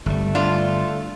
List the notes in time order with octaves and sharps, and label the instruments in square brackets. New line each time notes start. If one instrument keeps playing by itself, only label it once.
[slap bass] G1 G3 [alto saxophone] A3
[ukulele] D4 [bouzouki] F4